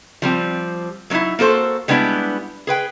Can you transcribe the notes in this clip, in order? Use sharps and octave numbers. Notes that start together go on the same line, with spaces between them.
F3 G3 C4
F#3 A#3 C4 D#4 E4
A#3 F#4 A4 C5
G3 G#3 B3 D4 E4
G#4 B4 G5